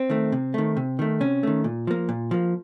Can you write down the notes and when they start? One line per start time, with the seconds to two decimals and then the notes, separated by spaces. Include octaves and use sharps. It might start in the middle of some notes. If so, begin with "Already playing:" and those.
Already playing: C4
0.10 D#3 A3
0.32 C3
0.54 D#3 A3
0.77 C3
0.99 D#3 A3
1.20 C3 C#4
1.43 D#3 A3
1.64 A#2
1.87 F3 A#3
2.09 A#2
2.31 F3 A#3